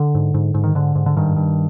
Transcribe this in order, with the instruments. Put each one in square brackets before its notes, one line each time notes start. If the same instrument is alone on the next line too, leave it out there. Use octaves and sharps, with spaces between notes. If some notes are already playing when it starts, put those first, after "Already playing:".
Already playing: [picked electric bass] D3
G#2
G#2
G#2
D#3
G#2 D3
G#2
D3
G2 D#3
G2